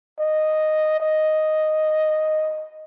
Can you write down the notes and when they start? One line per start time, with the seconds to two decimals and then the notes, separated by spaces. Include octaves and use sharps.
0.19 D#5
1.00 D#5